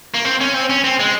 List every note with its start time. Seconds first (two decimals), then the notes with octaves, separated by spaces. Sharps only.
0.14 A#3
0.25 C4
0.41 C#4
0.54 C4
0.70 C#4
0.84 C4
1.00 G#3